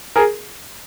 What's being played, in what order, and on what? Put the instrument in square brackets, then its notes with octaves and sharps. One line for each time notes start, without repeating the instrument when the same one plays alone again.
[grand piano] G#4 A#4